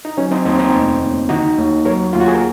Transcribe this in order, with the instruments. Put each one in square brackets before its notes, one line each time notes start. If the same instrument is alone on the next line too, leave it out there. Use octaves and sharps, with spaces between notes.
[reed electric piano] D#4
[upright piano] F#3 [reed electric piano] C#4
[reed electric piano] C4 D#4
[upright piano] D#2 [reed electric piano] C4 D#4
[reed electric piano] C4 D#4
[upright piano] F1
D#2
[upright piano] D#3 [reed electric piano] D#4 F#4
[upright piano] D#2
[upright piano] F#3 [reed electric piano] A#4 C#5
[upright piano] D#2 [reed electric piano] F4
[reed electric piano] F#4
G#4
A#4